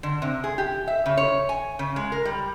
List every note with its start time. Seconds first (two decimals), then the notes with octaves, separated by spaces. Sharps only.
0.03 D3
0.22 C3
0.44 G#4
0.58 G4
0.87 E5
1.06 C#3
1.17 C#5
1.49 G#5
1.79 C#3
1.96 G#3
2.12 A#4
2.25 G3